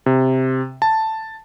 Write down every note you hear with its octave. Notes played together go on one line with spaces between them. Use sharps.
C3
A5